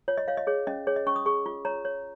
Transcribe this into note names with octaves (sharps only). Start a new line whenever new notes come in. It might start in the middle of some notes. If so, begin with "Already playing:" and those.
F4 C#5
D#5
C#5 F5
D#5
G#4 C#5
C#4 D#5
G#4 C#5
D#5
C#4 C#6
D#6
G#4 C#6
F4
C#5 A#5
C#5